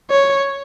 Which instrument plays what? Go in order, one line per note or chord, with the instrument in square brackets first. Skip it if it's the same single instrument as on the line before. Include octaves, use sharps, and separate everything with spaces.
[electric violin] C#5